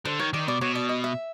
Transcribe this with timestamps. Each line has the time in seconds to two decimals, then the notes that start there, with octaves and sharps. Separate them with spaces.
0.05 D3 C5
0.20 D#3 C#5
0.33 D#3 D5
0.48 B2 D5
0.61 B2 C#5
0.75 D5
0.89 D#5
1.04 E5